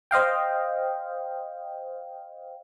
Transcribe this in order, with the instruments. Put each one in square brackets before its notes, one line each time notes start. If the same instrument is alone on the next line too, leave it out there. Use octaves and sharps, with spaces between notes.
[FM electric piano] C5 D#5 F5 G5